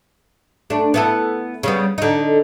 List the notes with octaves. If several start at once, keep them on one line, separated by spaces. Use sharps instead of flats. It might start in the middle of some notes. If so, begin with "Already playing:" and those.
A3 D4
B3 E4 A4
C#3 G3 B3
D3 D#4